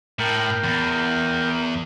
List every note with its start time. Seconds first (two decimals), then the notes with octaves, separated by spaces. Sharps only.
0.19 A2 A#4 G5
0.64 E2